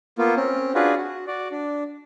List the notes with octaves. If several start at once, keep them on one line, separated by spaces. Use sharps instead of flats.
A#3 B3 F4
C4 C#4
D4 F4 F#4 G#4 B4
F#4
F#4 D5
D4